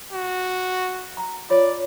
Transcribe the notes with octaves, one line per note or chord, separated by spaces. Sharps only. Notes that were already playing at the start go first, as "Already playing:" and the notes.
F#4
A#5
F4 C#5 D5